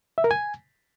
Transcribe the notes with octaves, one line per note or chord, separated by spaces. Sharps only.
E5
A#4
G#5